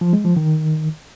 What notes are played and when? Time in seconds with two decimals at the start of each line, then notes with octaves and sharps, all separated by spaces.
0.01 F3
0.13 G#3
0.25 F3
0.37 D#3